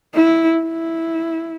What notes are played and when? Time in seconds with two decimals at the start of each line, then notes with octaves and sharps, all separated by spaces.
0.15 E4
0.62 E4